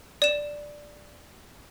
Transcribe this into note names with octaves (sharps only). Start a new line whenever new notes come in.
D5 E7